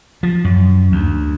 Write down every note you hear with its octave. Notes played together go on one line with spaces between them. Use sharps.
F3
F#2
D2